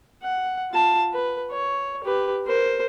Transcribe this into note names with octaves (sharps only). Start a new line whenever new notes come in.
F#5
F4 A5
B4
C#5
G4 B4
A#4 C5